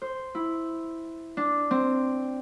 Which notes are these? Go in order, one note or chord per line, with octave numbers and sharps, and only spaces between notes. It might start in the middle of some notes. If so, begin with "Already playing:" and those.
C5
E4
D4
C4